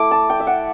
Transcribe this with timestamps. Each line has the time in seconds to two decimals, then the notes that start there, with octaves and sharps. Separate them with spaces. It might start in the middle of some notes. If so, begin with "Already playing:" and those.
Already playing: A3 E4 D6
0.11 A5
0.30 G5
0.40 E5
0.47 F#5